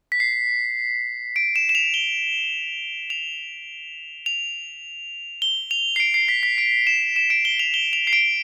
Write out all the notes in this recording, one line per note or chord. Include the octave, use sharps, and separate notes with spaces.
B6
C7
D7
E7
E7
F7
G7
F7
F7
G7
F7
C7
D7
C7
B6
B6
D7
E7
E7
D7
G7
F7
G7
F7
C7
D7